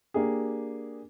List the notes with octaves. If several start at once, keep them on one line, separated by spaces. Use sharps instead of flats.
A#3 D4 G4 G#4